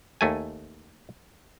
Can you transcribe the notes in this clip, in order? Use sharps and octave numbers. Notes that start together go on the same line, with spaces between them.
D#2 A3 G#5